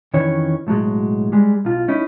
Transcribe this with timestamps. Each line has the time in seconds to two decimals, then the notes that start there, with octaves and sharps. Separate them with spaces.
0.14 F2 D#3 E3 C#4 C#5
0.67 B1 A2 D3 F#3 G#3
1.32 G3 G#3
1.65 B1 F4
1.88 C#4 D#4 E4